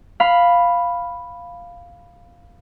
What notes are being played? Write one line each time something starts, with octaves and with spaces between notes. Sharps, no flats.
F5 B5